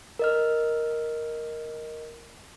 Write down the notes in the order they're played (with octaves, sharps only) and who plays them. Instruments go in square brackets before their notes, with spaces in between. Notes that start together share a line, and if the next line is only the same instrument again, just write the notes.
[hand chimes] A#4 D#5 F6